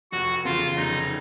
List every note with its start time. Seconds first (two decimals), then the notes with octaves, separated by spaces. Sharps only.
0.12 F1 F#4 F#5
0.45 E2 C#3 F4 F5
0.76 F1 D#4 D#5